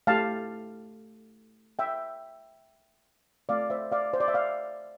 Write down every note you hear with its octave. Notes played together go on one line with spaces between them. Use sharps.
A3 E4 G4 F5 A5
E5 G5
A3 C4 F4 D5 F5
C5 E5
D5 F5
C5
D5
E5
D5 F5